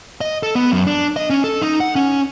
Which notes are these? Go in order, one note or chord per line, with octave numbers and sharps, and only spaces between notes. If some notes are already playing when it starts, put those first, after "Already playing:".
D#5
A4
B3
F#2
D4
D#5
C#4
A4
D#4
F#5
C#4